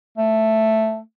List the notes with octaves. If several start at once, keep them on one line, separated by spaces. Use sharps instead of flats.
A3